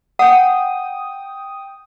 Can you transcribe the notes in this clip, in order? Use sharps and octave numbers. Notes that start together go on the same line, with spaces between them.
F#5 G5 D#6